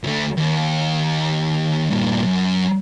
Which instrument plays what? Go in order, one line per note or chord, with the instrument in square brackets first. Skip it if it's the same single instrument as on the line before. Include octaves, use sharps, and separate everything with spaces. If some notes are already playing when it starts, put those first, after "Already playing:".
[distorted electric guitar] D2 A3
D#2
G2 A#2
F#2